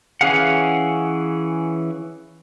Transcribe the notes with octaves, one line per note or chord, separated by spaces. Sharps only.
E3 C#4 G#4 F5 F#5